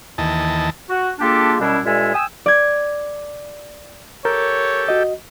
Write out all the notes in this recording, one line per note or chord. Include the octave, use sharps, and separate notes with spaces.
D#2 E3 D#5 A5
F#4
G#3 A#3 D4 F4 G4 A4
F#2 B2 G3 C#4 D4 E4
G2 A#2 G#3 A4 E5 G#5
G5 G#5 D#6 E6
D5 G#6
G4 A4 A#4 C#5
F#4 D#5